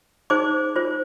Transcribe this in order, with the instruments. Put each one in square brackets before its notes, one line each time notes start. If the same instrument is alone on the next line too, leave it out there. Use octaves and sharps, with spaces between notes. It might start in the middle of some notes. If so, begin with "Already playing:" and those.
[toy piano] D#4 G#4 C5 D6
F4 C5